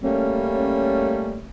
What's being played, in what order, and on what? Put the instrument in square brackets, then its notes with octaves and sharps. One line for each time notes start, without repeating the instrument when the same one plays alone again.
[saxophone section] G3 A3 A#3 C#4